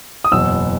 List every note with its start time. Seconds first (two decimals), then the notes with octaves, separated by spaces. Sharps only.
0.24 D#6
0.32 F#1 E2 B2 F#3 E6